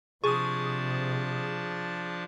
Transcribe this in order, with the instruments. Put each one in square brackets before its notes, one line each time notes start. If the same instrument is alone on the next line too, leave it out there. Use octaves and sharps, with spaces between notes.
[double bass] C3 [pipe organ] F3 D4 A5 [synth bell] G#4 D#6 [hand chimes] C#6